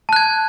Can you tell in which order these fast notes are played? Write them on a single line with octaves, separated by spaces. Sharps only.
A5 F#6 G#6